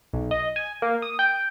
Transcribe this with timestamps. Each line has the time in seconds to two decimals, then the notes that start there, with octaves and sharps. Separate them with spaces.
0.13 B1
0.31 D#5
0.56 G#5
0.82 A#3
1.02 D#6
1.19 G5